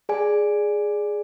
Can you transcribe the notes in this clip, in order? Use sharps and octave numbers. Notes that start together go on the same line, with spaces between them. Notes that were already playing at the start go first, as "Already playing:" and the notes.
G#4 D5 G#5